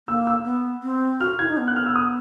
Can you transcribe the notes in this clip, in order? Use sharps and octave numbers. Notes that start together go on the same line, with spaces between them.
A#3 E6
E6
B3
C4
F#4 F6
E4 G#6
D#4
B3
F#6
F6
E6
D#6